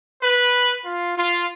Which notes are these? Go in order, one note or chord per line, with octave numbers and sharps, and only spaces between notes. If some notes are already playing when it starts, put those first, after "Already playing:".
B4
F4
F4